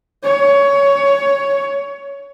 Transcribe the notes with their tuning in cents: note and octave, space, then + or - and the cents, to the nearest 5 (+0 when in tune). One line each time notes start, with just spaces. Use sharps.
C#5 +15